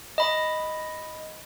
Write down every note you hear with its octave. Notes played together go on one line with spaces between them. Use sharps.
D#5 B5